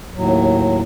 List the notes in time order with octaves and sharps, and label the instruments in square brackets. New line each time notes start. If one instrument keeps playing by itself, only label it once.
[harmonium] D#2 A2 F#3